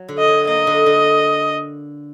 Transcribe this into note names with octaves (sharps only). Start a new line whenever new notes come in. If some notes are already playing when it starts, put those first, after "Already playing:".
Already playing: F#3
D3
D#5
F#3
A#3 D#5
D3
D3